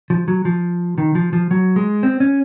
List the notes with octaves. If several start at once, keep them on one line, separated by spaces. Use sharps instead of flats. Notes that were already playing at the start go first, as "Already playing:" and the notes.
F3
F#3
F3
D#3
F3
F3
F#3
G#3
C4
C#4